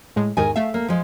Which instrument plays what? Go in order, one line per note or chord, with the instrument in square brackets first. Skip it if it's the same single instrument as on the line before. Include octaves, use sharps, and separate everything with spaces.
[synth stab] A2 G#3
[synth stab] E2 G#2 D#3 [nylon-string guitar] G#4 A#4 G#5
[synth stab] A3 E5 [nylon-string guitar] F5
[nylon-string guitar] A#3
F3 G#3